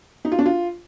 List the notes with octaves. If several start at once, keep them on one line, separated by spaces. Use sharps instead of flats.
D#4
F4
D4
F4